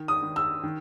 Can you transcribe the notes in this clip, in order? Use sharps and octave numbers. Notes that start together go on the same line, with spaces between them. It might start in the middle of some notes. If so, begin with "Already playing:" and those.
Already playing: D#3
D#6
D#3
E6
D#3